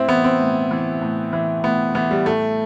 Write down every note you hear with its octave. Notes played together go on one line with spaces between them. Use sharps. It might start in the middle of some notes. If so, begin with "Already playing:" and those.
Already playing: A2 C4 E4
E3 B3
C4
A2
E3
A2
E3
A2 B3
E3 B3
G3
A2 A3